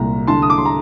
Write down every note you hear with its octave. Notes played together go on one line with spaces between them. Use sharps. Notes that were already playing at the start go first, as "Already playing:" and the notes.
Already playing: C2 A#2 A#5
D3 A5 C6
D#6
D6
C6
A#5